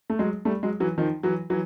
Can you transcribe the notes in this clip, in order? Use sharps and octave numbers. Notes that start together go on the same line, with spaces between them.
A3
F#3 G#3
G3 A3
F#3 G#3
E3 F#3
D#3 F3
E3 F#3
E3 F#3